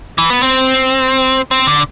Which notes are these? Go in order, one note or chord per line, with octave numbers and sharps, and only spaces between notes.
E3
B3
C4
C4
D3